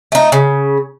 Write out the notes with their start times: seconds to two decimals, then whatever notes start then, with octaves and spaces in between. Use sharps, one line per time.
0.12 A3 D#4
0.32 C#3